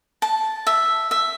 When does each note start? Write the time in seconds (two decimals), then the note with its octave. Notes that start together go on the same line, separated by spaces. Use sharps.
0.22 A5
0.67 E5
1.11 E5